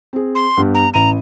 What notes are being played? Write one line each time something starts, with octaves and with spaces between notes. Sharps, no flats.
C4 G#4
C6
G2 B3 G4
A#5
A1 A#5 D#7